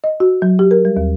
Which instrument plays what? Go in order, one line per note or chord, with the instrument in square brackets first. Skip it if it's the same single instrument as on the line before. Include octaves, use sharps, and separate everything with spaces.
[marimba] D#5
F#4
F#3
G4
A#4
G3
D#2